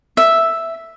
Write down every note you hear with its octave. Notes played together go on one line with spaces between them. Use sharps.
E5